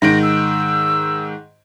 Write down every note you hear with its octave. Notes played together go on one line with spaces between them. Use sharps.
G#2 D#3 A#6 D7
E6